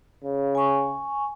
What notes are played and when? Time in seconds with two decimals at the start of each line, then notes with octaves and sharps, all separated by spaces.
0.24 C#3
0.55 G#5 C#6